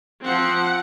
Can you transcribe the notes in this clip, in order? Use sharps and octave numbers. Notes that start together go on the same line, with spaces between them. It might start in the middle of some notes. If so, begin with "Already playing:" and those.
F3 C4 F#5